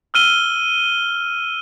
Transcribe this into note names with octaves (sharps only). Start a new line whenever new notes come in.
E6 F6 D#7 G7